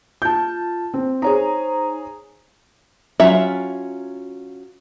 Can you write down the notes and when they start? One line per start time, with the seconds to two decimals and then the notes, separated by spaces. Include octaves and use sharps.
0.22 F4 A5 G6
0.94 C4
1.22 D#4 G#4 C5 C#5 A#5
3.20 F#3 C#4 F4 E5